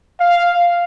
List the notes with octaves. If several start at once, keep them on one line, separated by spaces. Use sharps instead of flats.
F5